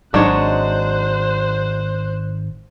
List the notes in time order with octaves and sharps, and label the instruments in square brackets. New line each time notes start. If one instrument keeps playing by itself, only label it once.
[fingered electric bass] G#1 [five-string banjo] F#3 G#3 D#4 [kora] D4 C#5 [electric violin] C5 F#6